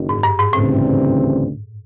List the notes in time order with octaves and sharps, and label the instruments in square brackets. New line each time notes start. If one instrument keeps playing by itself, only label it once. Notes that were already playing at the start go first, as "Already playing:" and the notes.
Already playing: [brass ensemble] F#1 F#2 D#3
[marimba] G#2
G2
G#2
[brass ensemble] D2 C#3 E3 G3 C4 [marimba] A2